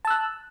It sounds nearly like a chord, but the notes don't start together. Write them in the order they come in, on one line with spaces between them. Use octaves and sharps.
A5 E6 F#6